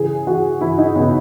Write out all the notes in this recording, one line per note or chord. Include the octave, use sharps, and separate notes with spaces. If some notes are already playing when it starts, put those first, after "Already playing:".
Already playing: C#3 E3 G#4
E3 F#4
E3 E4
D#4
C#3 B3